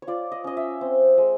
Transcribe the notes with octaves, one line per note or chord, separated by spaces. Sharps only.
C#5
F4 D5
D#5
C#4 D#5
E5
C4
G#3